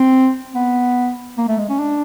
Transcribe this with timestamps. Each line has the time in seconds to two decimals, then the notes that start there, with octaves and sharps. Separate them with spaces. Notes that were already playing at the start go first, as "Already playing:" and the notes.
Already playing: C4
0.54 B3
1.38 A#3
1.48 A3
1.58 G#3
1.69 C#4
1.79 D4